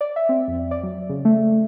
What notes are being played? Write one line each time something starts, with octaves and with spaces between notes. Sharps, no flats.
D5
E5
C4
F2
D5
F#3
C#3
A3